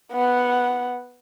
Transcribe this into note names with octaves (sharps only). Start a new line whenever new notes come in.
B3 F#5